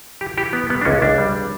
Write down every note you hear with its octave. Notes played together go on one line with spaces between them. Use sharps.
E3 G4
E3 G4
B3
G3 B3
D4
C#2 C#4
C#2 D4
G3